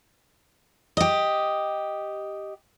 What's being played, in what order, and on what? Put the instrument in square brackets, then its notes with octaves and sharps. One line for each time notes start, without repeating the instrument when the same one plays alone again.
[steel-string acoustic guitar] G4 D#5